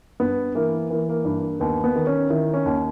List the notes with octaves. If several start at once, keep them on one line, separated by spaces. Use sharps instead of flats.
G2 B3
E3 A#3
E3 A#3
A#3
G2
D#2 B3
B3
D#3
C#4
D#3 E4
C#4
D#2